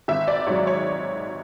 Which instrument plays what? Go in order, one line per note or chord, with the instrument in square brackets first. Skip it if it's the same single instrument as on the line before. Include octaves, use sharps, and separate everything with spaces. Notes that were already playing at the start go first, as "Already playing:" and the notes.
[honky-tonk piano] G#1 E5
D5
G#2 F#3 C#5
C#5